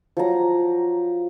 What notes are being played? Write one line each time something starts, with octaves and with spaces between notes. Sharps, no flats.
F3 F#3 A#5